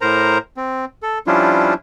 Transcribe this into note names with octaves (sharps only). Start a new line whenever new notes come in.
A2 A#4 C5 A#5
C4
A4
F3 G3 C#4 D4 E4 F4